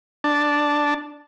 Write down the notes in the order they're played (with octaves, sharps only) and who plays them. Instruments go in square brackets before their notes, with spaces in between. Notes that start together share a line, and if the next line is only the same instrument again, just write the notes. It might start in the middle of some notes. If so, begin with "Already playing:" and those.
[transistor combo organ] D4 A5